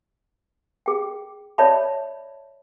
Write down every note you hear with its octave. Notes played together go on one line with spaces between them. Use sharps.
G#4 G5
C#5 D5 E5 A5 B5